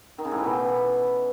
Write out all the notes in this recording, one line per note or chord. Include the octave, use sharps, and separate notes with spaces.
D#3
C#3
A2
E3
B2